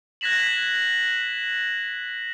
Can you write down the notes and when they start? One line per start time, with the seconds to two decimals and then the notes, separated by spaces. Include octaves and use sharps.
0.21 F#6 G#6 A#6 B6 E7 F#7